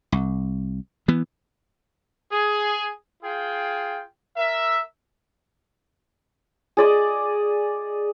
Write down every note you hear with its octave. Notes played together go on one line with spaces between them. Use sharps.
C2
E3 B3
G#4
F4 G#4 G5
A#4 E5
G#4 D5 D#5